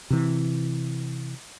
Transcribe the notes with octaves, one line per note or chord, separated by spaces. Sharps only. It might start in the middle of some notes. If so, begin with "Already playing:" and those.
C3 E3